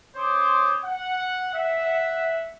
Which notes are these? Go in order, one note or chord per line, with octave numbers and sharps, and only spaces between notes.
C#4 C5 C#5 C6 D6 D#6
F#5
E5 F#5